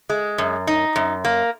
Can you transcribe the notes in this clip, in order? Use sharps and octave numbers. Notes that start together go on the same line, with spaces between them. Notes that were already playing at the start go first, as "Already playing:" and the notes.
G#3
F#2
D#4
F#2
A#3